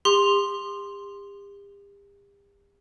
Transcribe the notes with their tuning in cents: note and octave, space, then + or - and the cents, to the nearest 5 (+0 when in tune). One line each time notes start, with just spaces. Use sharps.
G4 +40 C6 +0